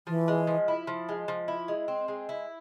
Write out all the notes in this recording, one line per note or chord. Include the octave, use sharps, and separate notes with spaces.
E3 F3
G#3
F3
E4
F3
G#3
F3
E4
G#3
C4
G#3
E4